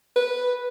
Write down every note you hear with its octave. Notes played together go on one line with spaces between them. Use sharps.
B4